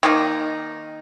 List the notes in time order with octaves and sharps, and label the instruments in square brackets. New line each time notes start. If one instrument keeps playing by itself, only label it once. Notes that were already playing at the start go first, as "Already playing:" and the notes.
[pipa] D#3 A#3 D#4